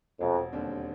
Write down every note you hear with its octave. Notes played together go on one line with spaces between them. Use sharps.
E1 F2
D#2 D3 G3 C4